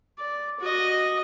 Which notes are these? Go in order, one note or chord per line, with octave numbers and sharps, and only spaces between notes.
D5
F#4 D#5